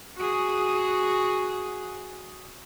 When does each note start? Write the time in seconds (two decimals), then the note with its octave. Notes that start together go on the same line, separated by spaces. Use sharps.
0.18 F#4 G#4